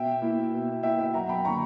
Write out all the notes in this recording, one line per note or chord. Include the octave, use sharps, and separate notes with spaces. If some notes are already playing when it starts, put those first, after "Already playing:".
Already playing: B2 E5 G5
A#3 E4
B2
A#3 E4 E5 G5
E5 G5
F#2 F#5 A#5
G5 B5
D3 F#3 A#3 A#5 C#6